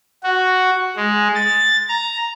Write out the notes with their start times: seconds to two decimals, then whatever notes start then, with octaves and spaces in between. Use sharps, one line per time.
0.23 F#4
0.96 G#3
1.35 A6
1.89 A#5